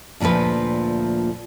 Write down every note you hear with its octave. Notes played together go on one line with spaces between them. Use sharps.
D2 A#2 E3 F3 B4